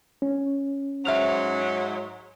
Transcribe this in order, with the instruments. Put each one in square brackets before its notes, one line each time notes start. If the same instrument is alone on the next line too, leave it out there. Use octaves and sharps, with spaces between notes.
[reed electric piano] C#4
[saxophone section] G#2 F#3 [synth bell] E5 F6 F7